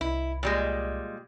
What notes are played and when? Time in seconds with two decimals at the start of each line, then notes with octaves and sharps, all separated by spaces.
0.01 C2 E4
0.43 A#2 G3 G#3